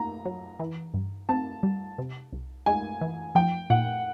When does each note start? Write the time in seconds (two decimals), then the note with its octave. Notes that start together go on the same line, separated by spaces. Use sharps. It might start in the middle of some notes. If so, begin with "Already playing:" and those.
Already playing: A#3 A#5
0.25 F#3
0.60 E3
0.94 G2
1.29 C4 A5
1.63 G3
1.98 C3
2.33 C2
2.66 G#3 G#5
3.01 E3
3.35 F3 G5
3.70 A#2 F#5